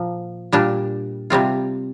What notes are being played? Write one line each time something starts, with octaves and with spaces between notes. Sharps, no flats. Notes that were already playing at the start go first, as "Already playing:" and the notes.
Already playing: A#2 F3 A#3
A#2 G3 D4
C3 G3 C4 F4